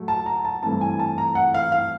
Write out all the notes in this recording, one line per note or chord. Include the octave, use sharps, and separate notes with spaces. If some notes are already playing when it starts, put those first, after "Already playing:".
Already playing: A2 F#3 A3
A5
A#5
A5
G2 E3 A3 C4 A5
G#5
A5
A#5
F#5
F5
F5